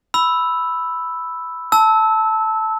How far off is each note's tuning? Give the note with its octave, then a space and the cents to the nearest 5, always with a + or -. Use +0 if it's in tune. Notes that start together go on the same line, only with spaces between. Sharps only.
B5 +5 E6 +0
A5 +0 E6 -20